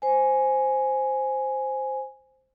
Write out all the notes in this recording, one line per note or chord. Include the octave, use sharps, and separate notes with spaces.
C5 G#5